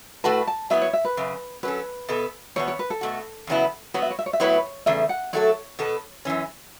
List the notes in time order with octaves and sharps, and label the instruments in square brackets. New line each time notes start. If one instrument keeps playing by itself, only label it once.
[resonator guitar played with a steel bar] A2 A3 F#4 B4 [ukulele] A5
[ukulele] A5
[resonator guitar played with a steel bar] F#3 B3 E4 [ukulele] E5
[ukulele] C#5
E5
B4
[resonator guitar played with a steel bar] F#2 C#3
[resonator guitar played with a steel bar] F#3 C#4 A4 [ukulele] B4
[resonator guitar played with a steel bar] B2 B3 A4
[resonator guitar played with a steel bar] E2 B2 B3 [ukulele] C#5
[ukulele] C#5
B4
A4
[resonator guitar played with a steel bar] B2 A3 F#4
E2 C#3 F#3 B3 E4
[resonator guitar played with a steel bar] F#3 B3 F#4 [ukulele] C#5
[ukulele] E5
C#5
E5
C#5
E5
[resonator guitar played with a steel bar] A2 F#3 B3 E4 B4 [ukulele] C#5
[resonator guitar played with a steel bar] E2 C#3 A3 [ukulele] E5
[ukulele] F#5
[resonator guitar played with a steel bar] F#3 A3 F#4 A4 [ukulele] C#5
[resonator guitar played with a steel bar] B2 B3 A4
F#2 E3 C#4